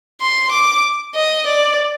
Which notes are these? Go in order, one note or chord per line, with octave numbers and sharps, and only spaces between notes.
C6
D6
D#5
D5